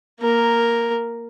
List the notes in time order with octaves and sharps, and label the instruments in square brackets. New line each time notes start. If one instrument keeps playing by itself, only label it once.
[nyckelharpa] A#3 A#4